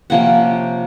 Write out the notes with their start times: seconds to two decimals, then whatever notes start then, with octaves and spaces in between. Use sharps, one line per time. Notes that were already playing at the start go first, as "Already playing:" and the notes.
0.10 C3 F3 A#3 C#4 F#5